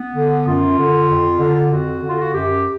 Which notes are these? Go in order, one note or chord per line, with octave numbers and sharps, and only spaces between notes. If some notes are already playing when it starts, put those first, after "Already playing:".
Already playing: B3
D3
F#2 F4
D3
F2
D3
F2 F#4
D3
F4
F#4
F#2 G4